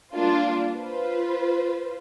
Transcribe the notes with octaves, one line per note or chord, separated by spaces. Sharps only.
G3 A#3 D4 F4
F4 B4 C5